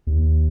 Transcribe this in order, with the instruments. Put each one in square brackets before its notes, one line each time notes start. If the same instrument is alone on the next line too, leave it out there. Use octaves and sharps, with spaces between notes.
[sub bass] D#2